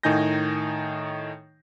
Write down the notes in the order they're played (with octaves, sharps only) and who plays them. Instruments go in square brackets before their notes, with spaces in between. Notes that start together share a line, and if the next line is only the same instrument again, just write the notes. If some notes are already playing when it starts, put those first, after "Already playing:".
[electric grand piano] A2 D#3 D#4 G#5 G6 A#6